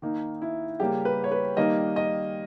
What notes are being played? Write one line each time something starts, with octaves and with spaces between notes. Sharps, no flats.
D#3 A#3 D#4
E4
C#3 G3 A#3 G4
B4
C#5
B4
D#3 G3 A#3 D#5
D#5